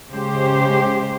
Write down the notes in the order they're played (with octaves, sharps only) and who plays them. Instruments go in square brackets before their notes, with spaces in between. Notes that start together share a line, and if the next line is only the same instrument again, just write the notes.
[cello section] C#3 G#3 G4 C5